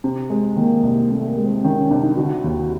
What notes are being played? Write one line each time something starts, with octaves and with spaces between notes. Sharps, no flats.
C3
G#3
D#3 A#3
C2
C3 A3
A#3
G#3
C4
D#3 C#4
C#4
C2 D4
D#4
D3 F#4
D#2